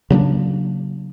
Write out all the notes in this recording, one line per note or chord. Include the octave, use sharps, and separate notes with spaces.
C#3 F#3 A#3 D4